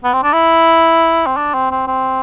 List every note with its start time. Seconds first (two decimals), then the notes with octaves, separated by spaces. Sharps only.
0.04 B3
0.13 C4
0.23 D4
0.33 E4
1.27 C4
1.37 D4
1.54 C4
1.71 C4
1.88 C4